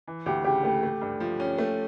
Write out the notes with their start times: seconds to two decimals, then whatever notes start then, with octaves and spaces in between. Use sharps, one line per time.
0.08 E3
0.26 D2 G4
0.45 C#3 G4
0.63 A3 G4
0.83 A3
1.02 G2
1.20 F3
1.40 C#4
1.58 A3